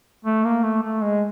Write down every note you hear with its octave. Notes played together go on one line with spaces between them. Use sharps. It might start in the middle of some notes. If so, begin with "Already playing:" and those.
A3
A#3
A3
A3
G#3